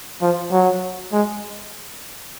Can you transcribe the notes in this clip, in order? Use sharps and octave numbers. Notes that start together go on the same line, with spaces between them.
F3
F#3
G#3